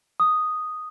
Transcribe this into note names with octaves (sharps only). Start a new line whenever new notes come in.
D#6